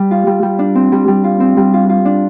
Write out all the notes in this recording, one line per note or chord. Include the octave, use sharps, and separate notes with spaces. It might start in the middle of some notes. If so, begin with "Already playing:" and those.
Already playing: G3
F4
G3
G3
D4
C4
G3
G3
F4
C4
G3
F4
F4
D4